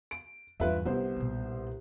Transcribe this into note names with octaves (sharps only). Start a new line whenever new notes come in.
D7
E2 G2 F4 B4 E5
C2 D3 B3 C5
B1 A#2